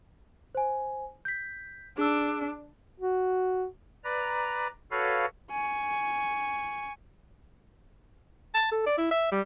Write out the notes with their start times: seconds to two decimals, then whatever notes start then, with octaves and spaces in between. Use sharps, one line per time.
0.55 C5 G#5
1.25 G6 B6
1.98 D4 G#4 E6
3.00 F#4
4.04 B4 D5 A#5
4.91 F#4 A4 B4 C#5 F5
5.51 G#5 C#6
8.54 A5
8.72 A4
8.86 D5
8.98 E4
9.11 E5
9.32 G3